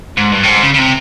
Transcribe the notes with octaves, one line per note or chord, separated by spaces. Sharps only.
G#2
G2
A2
G#2
C#3
C#3
C3